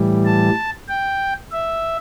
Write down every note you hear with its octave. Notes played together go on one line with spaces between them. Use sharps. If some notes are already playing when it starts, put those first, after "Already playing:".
Already playing: A2 E3 G3
A5
G5
E5